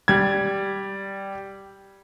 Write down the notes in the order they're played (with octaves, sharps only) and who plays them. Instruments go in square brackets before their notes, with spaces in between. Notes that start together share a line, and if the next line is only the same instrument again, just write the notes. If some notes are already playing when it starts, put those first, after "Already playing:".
[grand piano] G3 G#6